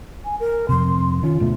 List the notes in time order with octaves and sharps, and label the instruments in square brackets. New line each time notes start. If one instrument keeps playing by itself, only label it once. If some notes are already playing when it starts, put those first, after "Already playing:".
[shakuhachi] G#5
A#4
[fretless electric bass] F2 C3 [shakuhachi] C6
[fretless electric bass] D#3 C#4 [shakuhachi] F4
[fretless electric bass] D2 B2 A3